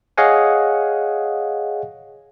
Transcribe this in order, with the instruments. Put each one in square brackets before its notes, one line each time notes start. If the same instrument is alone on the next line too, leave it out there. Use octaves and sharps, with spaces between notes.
[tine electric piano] G#4 C#5 D#5 F5 F#5 G#5